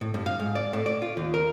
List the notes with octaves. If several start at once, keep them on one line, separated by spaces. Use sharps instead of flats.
A2
G2
F5
G#2
D5
A2
D5
F4
D#2
A#4